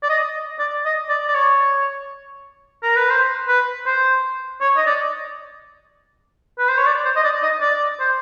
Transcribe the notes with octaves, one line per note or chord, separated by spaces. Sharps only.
D5
D#5
D5
D#5
D5
D5
C#5
A#4
B4
C5
B4
C5
C#5
D#5
D5
B4
C5
C#5
D5
C5
D#5
D5
D#5
D5
C5